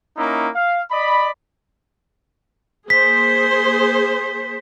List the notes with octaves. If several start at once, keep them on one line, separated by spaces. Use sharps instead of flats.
A#3 C#4 D#4 E4
F5
D5 D#5 B5
A#3 G#4 C5 B6